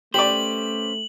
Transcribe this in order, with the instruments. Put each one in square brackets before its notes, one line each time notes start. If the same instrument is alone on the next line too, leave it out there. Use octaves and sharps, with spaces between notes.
[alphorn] A3 [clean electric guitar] C#4 B4 C5 [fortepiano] G4 D5 [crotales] F#7